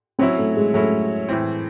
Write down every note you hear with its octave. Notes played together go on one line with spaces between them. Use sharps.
F#3 C4 C#4 E4
A3
G#3
F#3 A3 C#4 E4
A2 E3 C4